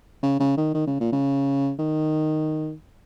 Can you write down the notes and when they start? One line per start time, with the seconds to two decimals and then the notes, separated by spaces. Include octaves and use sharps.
0.23 C#3
0.40 C#3
0.57 D#3
0.74 D#3
0.87 C#3
1.00 A#2
1.12 C#3
1.79 D#3